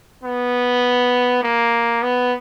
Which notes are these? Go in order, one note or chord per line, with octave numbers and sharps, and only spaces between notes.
B3
A#3
B3